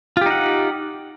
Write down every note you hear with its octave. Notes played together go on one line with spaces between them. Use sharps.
D#4 F4 G4 F#5